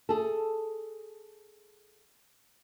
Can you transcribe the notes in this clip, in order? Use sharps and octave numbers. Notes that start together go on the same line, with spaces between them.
G#4 A4